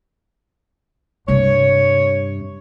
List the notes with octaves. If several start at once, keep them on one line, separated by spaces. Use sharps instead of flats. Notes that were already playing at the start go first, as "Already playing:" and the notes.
G2 C3 C#5